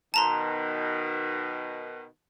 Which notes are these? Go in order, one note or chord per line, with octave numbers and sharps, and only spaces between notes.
B2 D#3 A5 A#5 C6